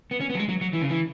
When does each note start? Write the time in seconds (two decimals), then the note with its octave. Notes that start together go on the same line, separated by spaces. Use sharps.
0.11 B3
0.20 C#4
0.30 B3
0.35 F#3
0.39 G#3
0.49 F#3
0.61 F#3
0.73 E3
0.82 C#3
0.90 E3